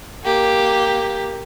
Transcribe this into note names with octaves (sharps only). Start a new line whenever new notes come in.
A#3 G4